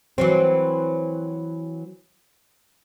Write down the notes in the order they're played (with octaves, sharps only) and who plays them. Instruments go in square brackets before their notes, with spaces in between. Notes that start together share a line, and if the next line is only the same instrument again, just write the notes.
[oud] E3 F#3 C4